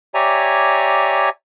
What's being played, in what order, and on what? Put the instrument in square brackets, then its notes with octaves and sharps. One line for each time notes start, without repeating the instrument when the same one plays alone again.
[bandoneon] G4 C#5 D5 E5 G#5 A#5